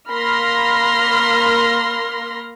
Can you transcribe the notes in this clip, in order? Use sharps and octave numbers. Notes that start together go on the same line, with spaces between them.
A#3 B5 C6 F6 A#6